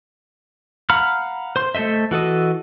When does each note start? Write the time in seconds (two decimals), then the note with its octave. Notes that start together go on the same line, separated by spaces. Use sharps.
0.90 F5 F#5 A#5 B5 F6
1.56 C5 C6
1.75 A3 A4 C5 D#5 E5
2.11 E3 F#4 A4 D#5